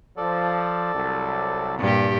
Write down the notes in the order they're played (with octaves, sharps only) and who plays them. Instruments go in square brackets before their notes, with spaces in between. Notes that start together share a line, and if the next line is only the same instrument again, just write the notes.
[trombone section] F3 [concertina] A4 D5
[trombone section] C2 F#3
[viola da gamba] G2 A#2 G4